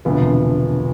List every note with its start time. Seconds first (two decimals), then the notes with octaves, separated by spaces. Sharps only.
0.05 E1 D2 C3 F3 B3